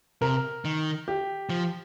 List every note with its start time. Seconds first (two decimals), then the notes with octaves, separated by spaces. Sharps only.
0.21 C3 A#4
0.65 D#3
1.08 G4
1.49 F3